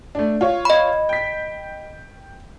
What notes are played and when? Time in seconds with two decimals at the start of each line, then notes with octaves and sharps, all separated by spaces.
0.15 A3 D4
0.41 F4 C#5
0.65 D#5 B5
1.09 G5 B6